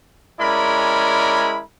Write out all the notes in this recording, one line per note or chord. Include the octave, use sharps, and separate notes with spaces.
G#3 C#4 E4 A#4 D5 B5